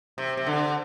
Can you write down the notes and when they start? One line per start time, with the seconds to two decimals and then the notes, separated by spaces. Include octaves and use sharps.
0.18 C3
0.37 C3
0.47 D3